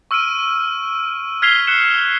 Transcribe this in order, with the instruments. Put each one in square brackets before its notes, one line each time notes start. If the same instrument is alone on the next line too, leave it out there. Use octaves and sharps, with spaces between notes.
[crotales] C#6 E6 F6 D7 D#7
F6 G#6 B6 C7 F7 G7
F#6 B6 C#7 E7